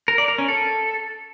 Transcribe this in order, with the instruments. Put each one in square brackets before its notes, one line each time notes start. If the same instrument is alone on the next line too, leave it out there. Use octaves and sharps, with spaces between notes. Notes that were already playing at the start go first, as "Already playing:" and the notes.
[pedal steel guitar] A#4
D5
A#4
C#4
A4